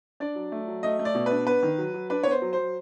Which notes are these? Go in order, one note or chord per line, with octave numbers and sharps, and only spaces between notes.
D4 D5
F#3
A3
F#3
A3 D#5
A3
D5
B2
D4 B4
B3 B4
D#3
F#3
F#3
D4 B4
C#5
B3 C5
F#3
F#3 C5